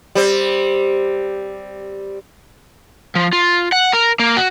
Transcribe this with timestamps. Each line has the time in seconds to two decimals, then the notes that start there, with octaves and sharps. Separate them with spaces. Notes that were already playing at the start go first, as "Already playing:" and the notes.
0.15 G3 C4
3.15 F3
3.33 F4
3.72 F#5
3.93 A#4
4.19 A#3
4.37 F#4